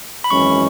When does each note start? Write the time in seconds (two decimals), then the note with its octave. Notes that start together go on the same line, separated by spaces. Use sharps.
0.24 B5
0.30 G#1 F#2 E3 G#3 C#4 C#6